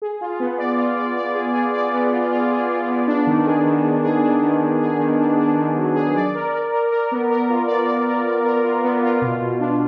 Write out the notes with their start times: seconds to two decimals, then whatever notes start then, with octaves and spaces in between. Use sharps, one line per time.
0.02 G#4
0.21 F4
0.40 B3
0.58 D5
0.78 F4
0.97 D5
1.17 D5
1.35 G#4
1.54 G#4
1.73 D5
1.94 B3
2.12 F4
2.32 F4
2.51 G#4
2.70 F4
2.89 B3
3.08 D4
3.27 D#3
3.46 G#4
3.66 D#3
3.85 D#3
4.04 G#4
4.23 D4
4.42 D#3
4.62 D#3
4.81 G#4
4.99 D#3
5.20 D4
5.38 D4
5.57 D#3
5.76 F#3
5.96 G#4
6.15 D5
6.34 A#4
6.53 D5
6.73 A#4
6.92 A#4
7.12 B3
7.30 A#4
7.50 F4
7.68 D5
7.88 D5
8.07 A#4
8.25 D5
8.45 A#4
8.65 F4
8.84 B3
9.03 F4
9.22 B2
9.41 B2
9.60 D4